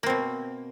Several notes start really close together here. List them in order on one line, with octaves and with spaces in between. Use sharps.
A#3 C4 B2